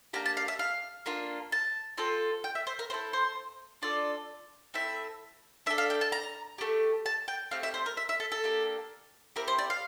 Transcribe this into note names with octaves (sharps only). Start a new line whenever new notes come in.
A#3 D4 G4 A#5
A5
F5
E5
F5
A#3 D4 F4
A5
C4 F4 A4
G5
E5
C5
A#4
C4 E4 A4 C5
C5
D4 F4 A4 D5
A3 C4 E4 E5
D4 A4 E5
F5
G5
A5
A#5
A3 D4 G4
A5
G5
A3 C4 G4 F5
E5
C5
A#4
E5
E5
A4
A4
A#3 D4 G4
C4 E4 G4 A#4
C5
D5
F5